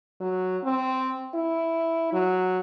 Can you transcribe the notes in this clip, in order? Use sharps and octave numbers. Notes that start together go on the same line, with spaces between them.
F#3
C4
E4
F#3